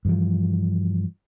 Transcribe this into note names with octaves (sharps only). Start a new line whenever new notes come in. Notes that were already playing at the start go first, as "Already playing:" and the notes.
G2 E3 F3